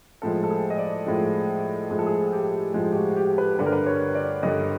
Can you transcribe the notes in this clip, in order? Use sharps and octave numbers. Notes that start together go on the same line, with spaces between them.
A2 F3 G#3 A4
A4
G#4
D#5
D5
A2 F3 G#3
A2 F3 G#3 G#4
A4
G#4
G4
A2 F3 G#3
G4
F#4
G4
B4
G2 D3 G3 B4
A#4
B4
C#5
D5
G2 D3 G3 D#5